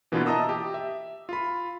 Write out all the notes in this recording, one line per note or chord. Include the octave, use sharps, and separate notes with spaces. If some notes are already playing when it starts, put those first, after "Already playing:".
B2 E3 A#3 B3 D4 F4
D#5 E5 A5 A#5 D#6 E6
G4
E5
F4 B5